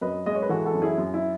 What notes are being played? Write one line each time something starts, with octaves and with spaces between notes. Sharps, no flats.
F#2 B4 D#5
G#3 D#5
C#5
B4
E3 F#4 A4
F#4 A4
F#2
E4 G#4
F#2
E4